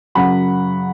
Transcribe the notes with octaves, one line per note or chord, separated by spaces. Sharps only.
F#2 C#3 F#3 F#5 B5